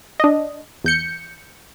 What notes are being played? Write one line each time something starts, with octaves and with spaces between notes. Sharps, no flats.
D4 D#5
E2 G6 C#7